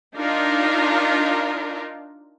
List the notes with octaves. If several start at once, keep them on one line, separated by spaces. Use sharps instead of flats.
D4 D#4 F4 A#4